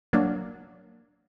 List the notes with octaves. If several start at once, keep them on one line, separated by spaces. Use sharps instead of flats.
F#3 A#3 D4